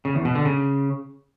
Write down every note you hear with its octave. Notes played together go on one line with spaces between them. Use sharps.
C#3
E2
B2
D3
C#3